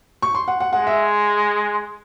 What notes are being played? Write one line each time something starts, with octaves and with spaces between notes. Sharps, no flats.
C#6
C6
F#5
F#5
G#3 F#5
E5